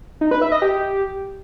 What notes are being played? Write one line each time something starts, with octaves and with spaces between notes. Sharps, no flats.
D#4
B4
E5
D#5
G4